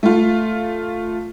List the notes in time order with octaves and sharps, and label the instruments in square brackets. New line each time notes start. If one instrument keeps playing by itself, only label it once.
[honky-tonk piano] A3 F4